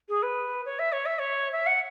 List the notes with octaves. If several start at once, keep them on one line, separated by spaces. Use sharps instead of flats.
G#4
B4
C#5
E5
C#5
E5
C#5
E5
F#5